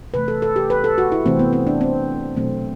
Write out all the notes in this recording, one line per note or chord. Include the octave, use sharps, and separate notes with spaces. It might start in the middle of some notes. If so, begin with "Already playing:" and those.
C3 E3 A3 B4
A4
A4
G4
B4
A4
F#4
E4
C3 E3 A3 C4
B3
C4
D4
C4
B2 F#3 A3 C4